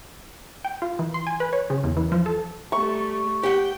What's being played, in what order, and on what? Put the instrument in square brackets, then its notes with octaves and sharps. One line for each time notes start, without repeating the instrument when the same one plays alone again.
[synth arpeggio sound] G5
F4
E3
C6
G#5
B4
C#5
C#3
E2
E3
F3
A4
[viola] G3 A3 [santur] C#6
[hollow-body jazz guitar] G4 F#5 [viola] G5